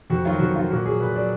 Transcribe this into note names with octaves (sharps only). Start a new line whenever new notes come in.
F2 F#4
D#3 F#3 F4
F2 F#4
D#3 F#3 F4
A#2 F#4
F#3 G#4
A#2 B4
F#3 D5